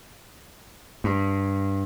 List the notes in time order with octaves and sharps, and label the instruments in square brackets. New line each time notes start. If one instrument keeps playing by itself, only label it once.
[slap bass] G2